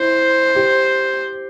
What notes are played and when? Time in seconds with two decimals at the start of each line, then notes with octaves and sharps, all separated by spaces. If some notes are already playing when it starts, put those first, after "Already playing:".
Already playing: E4 C5
0.55 G4